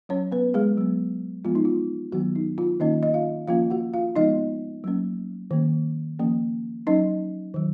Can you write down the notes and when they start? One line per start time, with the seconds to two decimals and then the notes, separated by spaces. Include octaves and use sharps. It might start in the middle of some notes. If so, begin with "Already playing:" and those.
0.09 F#3 C#4 C#5
0.32 B3 B4
0.54 G#3 G#4
0.78 F#3 B3
1.45 F3 G#3 B3 F4
1.55 D#4
1.65 F4
2.12 D#3 F#3 B3 F#4
2.35 D#4
2.58 F4
2.80 D#3 A#3 C#4 D#4 D#5
3.03 D#5
3.14 F4 F5
3.48 F3 A#3 C#4 F4 F5
3.70 F#4 F#5
3.94 F4 F5
4.16 F3 G#3 B3 D#4 D#5
4.84 F#3 A#3 C#4
5.51 D#3 A#3 C#4
6.19 F3 A#3 C#4
6.87 F#3 C#4 D#4 D#5
7.54 D#3 F#3